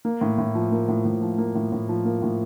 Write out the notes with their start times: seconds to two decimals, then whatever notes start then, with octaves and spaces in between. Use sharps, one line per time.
0.05 A#3
0.21 A2
0.38 A2
0.55 F3
0.72 A#3
0.88 A2
1.05 A2
1.22 F3
1.38 A#3
1.55 A2
1.72 A2
1.89 F3
2.05 A#3
2.22 A2